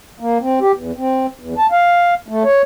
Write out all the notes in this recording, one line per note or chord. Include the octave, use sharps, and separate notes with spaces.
A#3
C4
G4
E2
C4
E2
A5
F5
A3
C#5